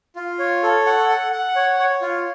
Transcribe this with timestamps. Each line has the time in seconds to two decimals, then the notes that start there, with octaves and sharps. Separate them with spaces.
0.16 F4
0.39 C#5
0.63 A4
0.86 F#5
1.10 F#5
1.33 F#5
1.56 C#5
1.79 C#5
2.02 F4